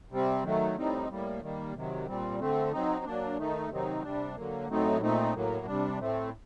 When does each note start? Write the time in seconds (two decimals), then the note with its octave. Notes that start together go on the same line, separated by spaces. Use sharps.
0.11 C3 G3 C4
0.43 D#3 F#3 A3
0.76 A2 G3 C4 D#4
1.09 A2 G3 A#3
1.41 D#3 G3 A#3
1.74 C3 D#3 F#3
2.07 A#2 G3 C4
2.39 D3 A3 C4
2.72 F#3 C4 D#4
3.05 F#3 A#3 D4
3.38 D#3 A3 D#4
3.70 C3 D#3 F#3 C4 D#4
4.03 C3 G3 D4
4.36 D3 F#3 A#3
4.69 A2 F#3 A3 C4 D#4
5.01 A#2 A3 C4 D#4
5.34 A2 F#3 A#3
5.66 C3 G3 D4
5.99 A2 A3 C4